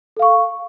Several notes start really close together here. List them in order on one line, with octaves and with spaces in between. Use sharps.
A4 F5 C#6